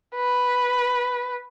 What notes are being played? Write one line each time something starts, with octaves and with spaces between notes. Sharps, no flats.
B4